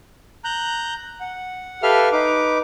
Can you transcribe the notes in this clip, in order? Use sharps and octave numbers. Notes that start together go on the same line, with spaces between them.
A#5 F#6 G6
F#5
G4 A4 B4 E5 F5 F6
D#4 B4 D6